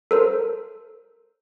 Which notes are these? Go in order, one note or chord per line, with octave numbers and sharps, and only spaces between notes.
A4 A#4 C5